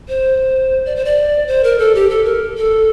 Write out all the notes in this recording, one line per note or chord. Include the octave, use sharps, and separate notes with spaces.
C5
D5
C5
D5
C5
A#4
A4
G4
A4
A#4
A4